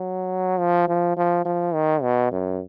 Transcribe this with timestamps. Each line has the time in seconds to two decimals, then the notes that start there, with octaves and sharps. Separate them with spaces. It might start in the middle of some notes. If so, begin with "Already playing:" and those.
Already playing: F#3
0.59 F3
0.88 F3
1.17 F3
1.45 F3
1.74 D#3
2.03 B2
2.32 F#2